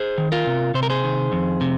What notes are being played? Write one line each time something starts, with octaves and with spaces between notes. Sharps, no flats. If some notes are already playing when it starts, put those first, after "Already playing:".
Already playing: G#4 C5
D#3
F4 A#4
C3
C3 C5
A#4
G#4 C5
D#3
F2
C3